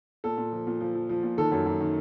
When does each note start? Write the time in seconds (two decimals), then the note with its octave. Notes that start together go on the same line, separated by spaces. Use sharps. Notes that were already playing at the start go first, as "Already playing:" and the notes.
0.24 A#2 A4
0.37 A#2
0.52 F3
0.67 A#2
0.81 F3
0.95 F3
1.09 F3
1.23 A#2
1.37 D#3 A4
1.51 F#2
1.66 F#2
1.80 D#3